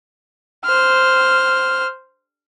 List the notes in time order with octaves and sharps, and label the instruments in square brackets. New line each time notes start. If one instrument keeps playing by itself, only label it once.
[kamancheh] C5 F6